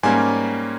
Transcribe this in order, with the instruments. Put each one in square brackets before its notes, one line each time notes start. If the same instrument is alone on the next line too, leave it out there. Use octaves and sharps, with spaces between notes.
[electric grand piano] G#2 G3 A#3 C#4 G#5